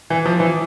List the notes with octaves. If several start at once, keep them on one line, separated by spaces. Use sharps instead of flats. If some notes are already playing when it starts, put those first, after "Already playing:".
E3
F3
E3